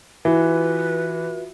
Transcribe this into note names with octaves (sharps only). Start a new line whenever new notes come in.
E3 F4 F#4 B4 E5